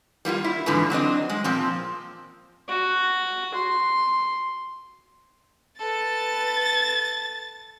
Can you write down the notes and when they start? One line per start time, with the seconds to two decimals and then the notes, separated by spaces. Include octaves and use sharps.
0.25 G3 A#3 E4 F4
0.44 E4
0.66 F2 G#2 D3 E3 F3
0.90 F#3 C4 D4 D#5
1.29 G#3
1.44 A#2 F3 C4
2.68 F#4
3.54 C6
5.79 A4 B4 A6